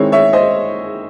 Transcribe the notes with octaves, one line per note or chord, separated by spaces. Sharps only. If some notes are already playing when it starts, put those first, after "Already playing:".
Already playing: D#3 G#3 C4 E4 C#5
C#5 E5
C5 D#5